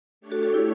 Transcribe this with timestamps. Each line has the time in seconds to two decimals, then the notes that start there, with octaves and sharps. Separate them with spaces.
0.21 A3 D4 G4 C#5
0.32 F#4 A4
0.43 F#4 A4
0.54 E4 G4